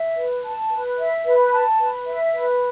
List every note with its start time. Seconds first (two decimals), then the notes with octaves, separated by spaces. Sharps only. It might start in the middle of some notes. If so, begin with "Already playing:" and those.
Already playing: E5
0.16 B4
0.43 A5
0.70 B4
0.98 E5
1.25 B4
1.52 A5
1.79 B4
2.07 E5
2.34 B4